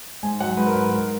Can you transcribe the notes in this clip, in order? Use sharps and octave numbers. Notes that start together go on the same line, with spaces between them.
G#2 G#5
F#3 F#5
G#2 B4
A#4
F#3 B4
G#2 A#4